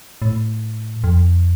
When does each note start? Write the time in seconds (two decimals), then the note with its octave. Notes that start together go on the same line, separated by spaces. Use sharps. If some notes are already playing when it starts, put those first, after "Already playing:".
0.22 A2
1.04 F2